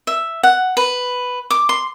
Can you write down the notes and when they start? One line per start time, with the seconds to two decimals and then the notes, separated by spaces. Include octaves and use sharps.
0.07 E5
0.43 F#5
0.77 B4
1.51 D6
1.69 C6